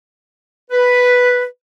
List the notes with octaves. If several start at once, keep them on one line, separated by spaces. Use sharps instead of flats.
B4